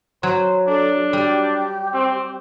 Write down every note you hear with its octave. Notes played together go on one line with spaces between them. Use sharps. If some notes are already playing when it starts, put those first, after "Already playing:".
F#3 C5
D4 A4
G3 G4
C4